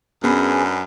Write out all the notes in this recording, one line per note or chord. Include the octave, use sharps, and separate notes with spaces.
F#2 B3 C#4 D4 G#4 B5